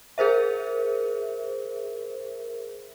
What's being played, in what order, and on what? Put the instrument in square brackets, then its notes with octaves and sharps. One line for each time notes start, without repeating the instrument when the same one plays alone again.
[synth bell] G#4 A#4 C5 E5